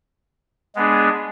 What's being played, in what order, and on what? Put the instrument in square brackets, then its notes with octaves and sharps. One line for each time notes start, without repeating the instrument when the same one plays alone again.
[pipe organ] G#3 B3 D4 G#4